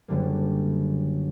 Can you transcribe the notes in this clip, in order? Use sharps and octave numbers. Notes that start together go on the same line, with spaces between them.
F#1 F#2 D3 G3 A#3